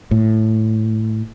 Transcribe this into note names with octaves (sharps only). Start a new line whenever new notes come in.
A2